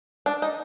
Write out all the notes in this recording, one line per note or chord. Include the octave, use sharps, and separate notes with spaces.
D4
D#4